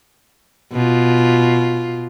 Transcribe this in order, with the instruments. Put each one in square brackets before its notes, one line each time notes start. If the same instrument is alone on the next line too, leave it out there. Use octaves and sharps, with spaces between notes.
[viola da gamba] B2 F4